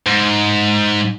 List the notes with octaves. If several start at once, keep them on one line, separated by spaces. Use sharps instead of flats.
G#2